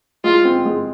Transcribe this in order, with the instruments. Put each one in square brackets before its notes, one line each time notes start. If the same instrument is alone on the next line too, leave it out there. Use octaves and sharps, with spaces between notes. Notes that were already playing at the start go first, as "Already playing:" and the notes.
[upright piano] G#3 [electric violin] F4
[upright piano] C4
G#3